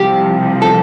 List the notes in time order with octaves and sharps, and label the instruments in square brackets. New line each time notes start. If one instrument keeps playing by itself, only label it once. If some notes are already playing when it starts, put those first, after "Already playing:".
Already playing: [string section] C2 C3 F3 [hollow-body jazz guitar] G4
[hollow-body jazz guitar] A4